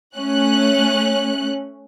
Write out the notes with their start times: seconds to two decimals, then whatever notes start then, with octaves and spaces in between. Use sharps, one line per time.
0.17 A3 C#4 F#6